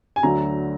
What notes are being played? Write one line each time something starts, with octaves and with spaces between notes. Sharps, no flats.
G#5
D2 D3 F#3 A#5